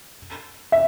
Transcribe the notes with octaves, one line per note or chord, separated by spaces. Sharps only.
E5